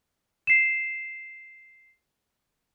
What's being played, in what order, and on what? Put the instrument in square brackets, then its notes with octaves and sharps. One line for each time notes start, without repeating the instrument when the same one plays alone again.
[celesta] C7 E7